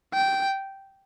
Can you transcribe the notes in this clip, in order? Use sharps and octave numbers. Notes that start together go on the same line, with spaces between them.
G5